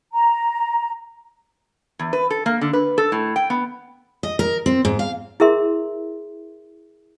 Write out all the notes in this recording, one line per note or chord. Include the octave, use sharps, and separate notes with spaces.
A#5
E2
B4
A4
A#3
D3
B4
A4
A2
G5
B3
D#5
A#4
C4
G#2
F5
E4 G#4 A#4 E5 C6